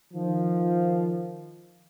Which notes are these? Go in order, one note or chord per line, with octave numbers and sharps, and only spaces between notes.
D#3 F3